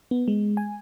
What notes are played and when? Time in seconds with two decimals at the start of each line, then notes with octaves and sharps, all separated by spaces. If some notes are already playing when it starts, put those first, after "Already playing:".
0.11 B3
0.28 G#3
0.57 G#5